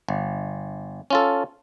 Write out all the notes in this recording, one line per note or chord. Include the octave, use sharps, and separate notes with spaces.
G1
C#4 F4 A4